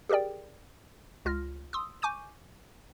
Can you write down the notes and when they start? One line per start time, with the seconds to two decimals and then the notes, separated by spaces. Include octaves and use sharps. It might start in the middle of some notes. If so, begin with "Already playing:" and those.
0.09 G4 G#4 A#4 D5 G5
1.25 C#2 F4 F6 A#6
1.73 C6 D#6 E6
2.02 G#5 C#6 D6 G6 D#7